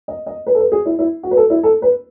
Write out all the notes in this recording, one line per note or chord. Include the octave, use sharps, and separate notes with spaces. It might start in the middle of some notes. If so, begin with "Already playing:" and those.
D#5
D#5
B4
A4
B4
G#4
E4
E4
F#4
B4
A4
E4
A4
B4